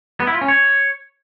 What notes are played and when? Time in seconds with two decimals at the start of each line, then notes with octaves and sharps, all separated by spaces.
0.20 B3
0.27 E4
0.34 F4
0.41 C#4
0.48 C#5